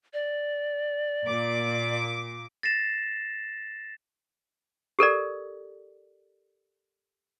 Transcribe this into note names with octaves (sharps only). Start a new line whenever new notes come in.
D5
A#2 D6
A6 A#6 C7 E7
G4 A4 A#4 D5